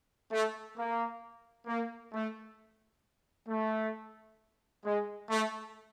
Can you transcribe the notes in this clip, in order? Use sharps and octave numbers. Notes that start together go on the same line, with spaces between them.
A3
A#3
A#3
A3
A3
G#3
A3